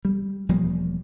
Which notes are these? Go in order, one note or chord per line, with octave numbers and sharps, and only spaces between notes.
G3
E1 F3 G3 A#3